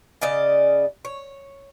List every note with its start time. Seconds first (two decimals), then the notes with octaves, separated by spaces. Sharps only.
0.22 C#3 D5 D#5
1.05 C#5